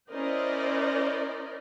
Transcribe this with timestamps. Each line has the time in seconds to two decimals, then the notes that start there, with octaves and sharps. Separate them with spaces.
0.10 C#4 E4 A#4 C5 D5 D#5